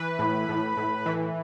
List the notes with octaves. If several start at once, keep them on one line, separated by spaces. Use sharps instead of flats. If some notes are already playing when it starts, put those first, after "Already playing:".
Already playing: E3 B4
A2
A2
A2
E3